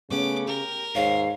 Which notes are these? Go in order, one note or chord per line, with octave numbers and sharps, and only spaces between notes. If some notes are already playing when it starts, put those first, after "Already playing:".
C#3 A3 B3 C#4 D6
G4 A#4
D#2 G#2 C#5 F5